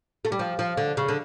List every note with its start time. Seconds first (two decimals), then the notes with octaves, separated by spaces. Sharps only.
0.25 A3
0.32 G3
0.39 F3
0.59 F3
0.77 D3
0.97 C#3
1.08 D3